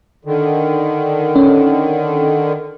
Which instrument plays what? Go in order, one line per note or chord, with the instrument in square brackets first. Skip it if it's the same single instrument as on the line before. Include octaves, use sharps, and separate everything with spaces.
[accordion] D3 D#3
[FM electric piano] C#4